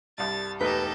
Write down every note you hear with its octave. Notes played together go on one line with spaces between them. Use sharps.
C2 G2 A6
E1 A3 D#4 G4 A4 B4 G6 B6